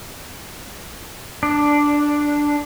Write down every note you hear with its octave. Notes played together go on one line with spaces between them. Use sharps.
D4